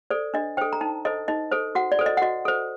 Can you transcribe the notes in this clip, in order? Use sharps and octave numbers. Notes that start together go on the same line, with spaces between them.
A4 C5 D5
D4 D#5
A4 C5 G5
A#5
D#4 A5
A4 C5 D#5
D#4 D#5
A4 C5
F#4 F#5
D5
A4 C5
D#5
F#5
F#4 D#5
A4 C5